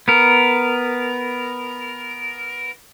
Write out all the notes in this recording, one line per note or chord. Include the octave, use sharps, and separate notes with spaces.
B3 A#4